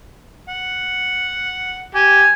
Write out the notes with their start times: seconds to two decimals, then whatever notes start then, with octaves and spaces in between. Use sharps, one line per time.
0.49 F#5
1.95 G4 G#5